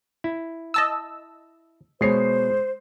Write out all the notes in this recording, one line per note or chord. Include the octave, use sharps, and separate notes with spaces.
E4
D#5 A5 E6
B2 G#3 C5 C#5 C7